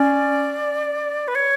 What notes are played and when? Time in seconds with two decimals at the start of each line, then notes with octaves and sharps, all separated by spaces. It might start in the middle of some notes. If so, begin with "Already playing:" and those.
Already playing: C#4 D5
1.28 B4
1.35 C#5